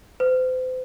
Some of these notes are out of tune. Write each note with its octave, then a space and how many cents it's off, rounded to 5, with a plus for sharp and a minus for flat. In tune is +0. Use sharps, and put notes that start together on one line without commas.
C5 -40